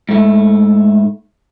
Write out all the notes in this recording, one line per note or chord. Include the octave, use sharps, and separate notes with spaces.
G#2 A3